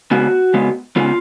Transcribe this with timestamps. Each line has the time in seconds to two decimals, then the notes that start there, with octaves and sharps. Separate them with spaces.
0.11 C#3 G#3 B3 F#4
0.54 C#3 G#3 B3
0.96 C#3 G#3 B3 F4